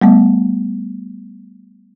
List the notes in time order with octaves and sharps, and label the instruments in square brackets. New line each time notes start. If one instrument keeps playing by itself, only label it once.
[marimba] G3 A3 B3